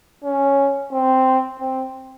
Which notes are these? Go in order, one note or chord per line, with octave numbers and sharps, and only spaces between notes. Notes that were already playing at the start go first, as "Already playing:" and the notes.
C#4
C4
C4